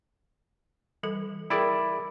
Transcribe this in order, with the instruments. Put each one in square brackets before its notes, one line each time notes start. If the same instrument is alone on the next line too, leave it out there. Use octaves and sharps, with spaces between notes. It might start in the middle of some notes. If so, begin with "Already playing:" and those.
[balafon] E3 G3 A4
[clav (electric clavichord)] E4 D5 [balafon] G#4 A#4 G5